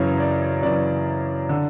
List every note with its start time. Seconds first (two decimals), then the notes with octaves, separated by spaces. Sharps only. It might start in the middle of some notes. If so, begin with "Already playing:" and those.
Already playing: F#2 C#3 E3 C#5
0.20 D5
0.63 F#2 C#3 E3 D5
1.49 D3